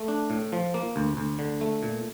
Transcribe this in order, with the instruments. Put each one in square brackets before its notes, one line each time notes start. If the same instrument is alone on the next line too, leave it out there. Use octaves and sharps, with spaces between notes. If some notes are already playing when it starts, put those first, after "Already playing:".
Already playing: [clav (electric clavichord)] A3
D4
A2
F3
A#3
D2
D2
D3
A3
A#2